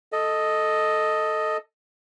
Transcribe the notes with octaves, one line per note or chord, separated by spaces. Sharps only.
A4 D#5